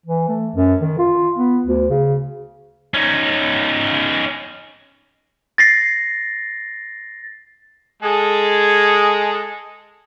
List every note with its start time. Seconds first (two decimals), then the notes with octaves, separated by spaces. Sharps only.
0.06 E3
0.28 A3
0.56 F#2
0.81 D#3
0.98 F4
1.38 B3
1.66 D2
1.90 C#3
2.94 C#4 D#4
5.58 A6 A#6 C7
8.03 G#3 G#4 A4